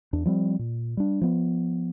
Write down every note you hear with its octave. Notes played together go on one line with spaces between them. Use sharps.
E2 D4
F3 G3 C4
A#2
G3 D4
F3 B3